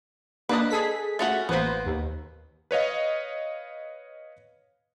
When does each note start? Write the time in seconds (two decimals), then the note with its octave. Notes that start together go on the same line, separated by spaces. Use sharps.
0.49 A#3 D4 B4 D#5
0.70 G#4 A4 B6
1.19 A3 C#4 F#4
1.49 A1 A#3 B3 B4 C5
1.86 D#2
2.71 B4 C#5 D#5 F5